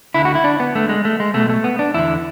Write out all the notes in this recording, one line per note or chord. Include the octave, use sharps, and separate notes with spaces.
D2 D3 E4
F#4
E4
D4
B3
D2 D3 A3
G#3
A3
G#3
B1 B2 A3
A3
B3
D4
E2 D3 E4